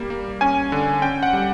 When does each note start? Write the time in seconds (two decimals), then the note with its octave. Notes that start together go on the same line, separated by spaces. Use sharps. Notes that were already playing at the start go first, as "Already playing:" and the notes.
Already playing: G3 A#3
0.10 A#3
0.41 C#4 G#5
0.72 D3
1.02 C#4 G5
1.23 F#5
1.33 G3